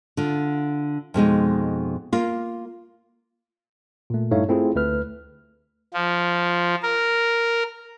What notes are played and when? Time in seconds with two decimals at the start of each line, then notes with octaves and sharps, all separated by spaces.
0.17 D3 F4
1.14 F2 B2 G#3 D#4
2.13 A#3 F4
4.10 A#2 A3
4.31 G2 A3 D#4 E4 C#5 F5
4.48 A3 C4 E4 F4 G#4
4.75 D2 A3 B4 F6
5.94 F3
6.83 A#4